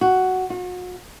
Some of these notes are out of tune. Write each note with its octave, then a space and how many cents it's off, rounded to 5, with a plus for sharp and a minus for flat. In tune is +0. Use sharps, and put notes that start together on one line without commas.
F#4 +5
F#4 -40